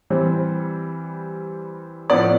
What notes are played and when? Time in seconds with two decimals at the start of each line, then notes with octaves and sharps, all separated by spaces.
0.10 E3 G3 C4
2.10 A2 F3 B3 D5